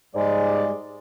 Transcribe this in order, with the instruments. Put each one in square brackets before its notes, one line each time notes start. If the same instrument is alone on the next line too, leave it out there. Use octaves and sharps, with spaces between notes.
[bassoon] G#2 [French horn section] G3 G#4 D5 [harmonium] G#3